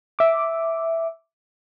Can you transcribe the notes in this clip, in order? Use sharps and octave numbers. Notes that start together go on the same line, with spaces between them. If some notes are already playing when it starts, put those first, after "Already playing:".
E5 D6